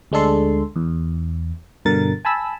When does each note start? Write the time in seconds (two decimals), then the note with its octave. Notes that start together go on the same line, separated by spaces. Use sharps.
0.12 D2 G#3 D4 A4 C6
0.76 E2
1.85 G2 B2 D3 A#4 A6
2.25 G#5 A5 B5 E6